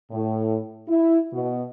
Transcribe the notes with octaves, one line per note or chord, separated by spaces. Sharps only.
A2
E4
B2